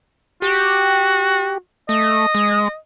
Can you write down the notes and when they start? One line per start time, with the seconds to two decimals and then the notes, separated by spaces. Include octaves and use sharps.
0.42 F#4 G4
1.89 A3 D#5
2.35 G#3